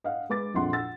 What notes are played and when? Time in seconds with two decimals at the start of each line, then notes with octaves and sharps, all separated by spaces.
0.04 D#5 F5 F#5
0.29 G#3 B4 D6 A6
0.54 A#1 F2 F#5 C6
0.73 F#5 E6 A6